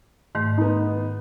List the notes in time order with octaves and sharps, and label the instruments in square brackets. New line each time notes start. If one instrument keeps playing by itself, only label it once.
[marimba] G#2 D#3 A3
[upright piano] B3 D#4